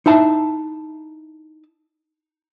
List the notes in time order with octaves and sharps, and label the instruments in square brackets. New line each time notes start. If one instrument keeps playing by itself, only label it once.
[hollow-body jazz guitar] D#4 E4 E5 A5